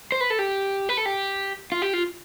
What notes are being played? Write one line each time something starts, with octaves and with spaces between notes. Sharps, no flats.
C5
B4
A4
G4
B4
A4
G4
F4
G4
F4